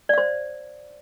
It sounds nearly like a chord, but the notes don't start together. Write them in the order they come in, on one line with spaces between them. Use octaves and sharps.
D5 F5 C5